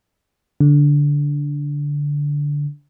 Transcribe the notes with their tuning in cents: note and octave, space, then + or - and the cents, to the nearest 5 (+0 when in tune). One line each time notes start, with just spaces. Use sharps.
D3 -15